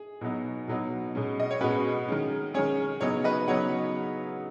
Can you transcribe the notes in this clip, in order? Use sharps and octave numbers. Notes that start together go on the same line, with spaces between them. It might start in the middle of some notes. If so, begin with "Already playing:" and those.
Already playing: G#4
B2 F#3 B3 D#4
B2 F#3 B3 D#4
B2 G#3 C#4
D#5
C#5
B2 G#3 C#4 F#4 B4
D#3 G#3 C#4
D#3 G#3 C#4 G#4 C#5
C#3 F#3 B3 D#4 G#4 C#5
B4 D#5
C#3 F#3 B3 D#4 C#5 F#5